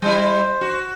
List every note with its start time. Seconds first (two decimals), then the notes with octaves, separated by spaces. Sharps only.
0.02 G3 E4 C5
0.61 F#4